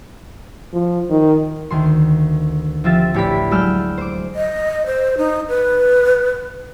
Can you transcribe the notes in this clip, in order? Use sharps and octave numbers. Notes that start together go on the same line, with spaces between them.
F3
D#3
D2 D#3 C6
F3 C4 F4 G4 E5 A6
A1 E4 G4 D5 B5 B6
F#3 G#3 D5 E6 F6 G6
C5 D6
D#5
C5
D#4
B4